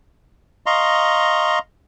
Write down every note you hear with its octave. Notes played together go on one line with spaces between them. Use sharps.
D#5 F5 A#5 C6 C#6